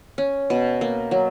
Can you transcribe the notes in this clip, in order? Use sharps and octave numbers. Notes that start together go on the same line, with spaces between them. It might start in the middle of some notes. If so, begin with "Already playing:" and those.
C#4
B2
A#3
F#3